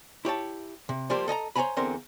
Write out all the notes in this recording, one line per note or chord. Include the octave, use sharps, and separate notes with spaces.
E4 G4 C#5 A5
C3
F3 G3 A#3 G4 C5
A4 D#5 G#5 A#5
C5 C#5 F#5 G#5 A#5 B5
E2 D3 C4 A#4 C5